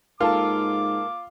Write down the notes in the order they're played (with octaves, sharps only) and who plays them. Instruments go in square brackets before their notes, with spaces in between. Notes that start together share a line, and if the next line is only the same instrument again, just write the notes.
[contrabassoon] G#2 [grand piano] A#3 A4 A5 [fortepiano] F4 [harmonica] D6